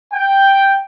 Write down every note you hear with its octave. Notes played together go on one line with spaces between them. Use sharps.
G5